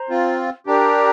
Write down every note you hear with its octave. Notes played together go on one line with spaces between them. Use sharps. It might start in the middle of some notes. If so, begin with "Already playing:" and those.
Already playing: C5 A#5
C4 F4
D4 G4 A#4 G5 A#5